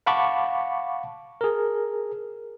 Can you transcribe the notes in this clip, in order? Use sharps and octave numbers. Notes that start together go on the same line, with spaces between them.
F5 F#5 A5 B5 C#6 D6
G#4 A#4